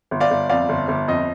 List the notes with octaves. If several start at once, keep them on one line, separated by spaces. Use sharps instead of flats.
G1
D5 F5
G1
F2 D5 F5
G1
G1
F2 D#5